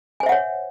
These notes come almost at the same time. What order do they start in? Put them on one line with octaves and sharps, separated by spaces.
G#5 C5 E5 F#5 C#5